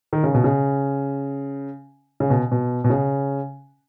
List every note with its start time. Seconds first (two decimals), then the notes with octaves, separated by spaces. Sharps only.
0.13 D#3
0.24 C#3
0.34 B2
0.44 C#3
2.20 C#3
2.30 B2
2.52 B2
2.84 B2
2.90 C#3